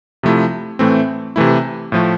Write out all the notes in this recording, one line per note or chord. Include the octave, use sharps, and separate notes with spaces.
C3 F3 A3 E4
A2 E3 A3 C4
C3 E3 A3 E4
A2 F3 A3